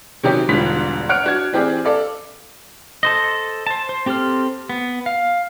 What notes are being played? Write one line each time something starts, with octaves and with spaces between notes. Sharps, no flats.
C3 D#3 F#3 C#4 D#4 G4
E1 G#2 D3 F3 G3 B6
C#5 F#5 F6 D7
D4 F#4 G#6
E3 C4 G4 G#4 D5
A4 D5 F5
A4 C5 D#5
C5 A5
C5
C4 G4 A4 C5 F6
B3
F5